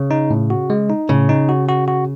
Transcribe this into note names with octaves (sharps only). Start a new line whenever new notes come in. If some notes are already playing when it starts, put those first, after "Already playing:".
Already playing: C#3
D#4
A2
F#4
G#3
D#4
A2 C#3
D#4
F#4
F#4
F#4